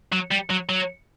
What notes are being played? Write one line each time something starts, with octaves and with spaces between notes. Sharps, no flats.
F#3
G3
F#3
F#3